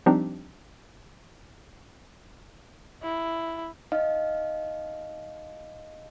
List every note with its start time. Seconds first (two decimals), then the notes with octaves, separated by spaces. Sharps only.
0.06 F3 G3 C4 D4 D#4 G4
3.03 E4
3.92 D#4 D#5 F5